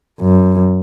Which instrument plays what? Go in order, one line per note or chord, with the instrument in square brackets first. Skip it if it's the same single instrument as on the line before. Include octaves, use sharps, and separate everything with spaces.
[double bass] F#2